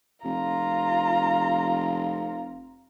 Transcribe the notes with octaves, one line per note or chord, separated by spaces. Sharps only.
F1 F4 A#5